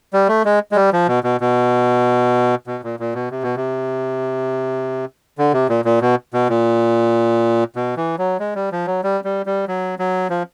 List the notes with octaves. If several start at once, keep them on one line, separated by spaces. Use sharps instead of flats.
G3
A3
G#3
G#3
G3
F3
B2
B2
B2
B2
A#2
A#2
B2
C3
B2
C3
D3
C3
A#2
A#2
B2
B2
A#2
B2
E3
F#3
G#3
G3
F3
F#3
G3
G3
G3
F#3
F#3
F3